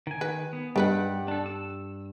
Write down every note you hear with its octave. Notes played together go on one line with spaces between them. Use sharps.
D#3 G#5
B4
B3
G2 D#3 G3 B4 F#5 B5
D4 A4
E6